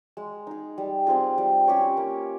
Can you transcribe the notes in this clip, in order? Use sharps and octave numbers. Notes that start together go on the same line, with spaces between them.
G#3
D#4 G#4
G3
C4 F4 G#4
G3
C#4 G4 C#5
A#3